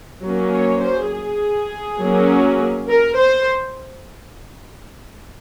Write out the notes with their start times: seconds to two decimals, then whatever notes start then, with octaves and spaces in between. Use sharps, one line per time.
0.23 F#3 A#3 C#4
0.53 C#5
0.82 C5
1.11 G#4
2.00 F#3 A#3 C#4
2.89 A#4
3.18 C5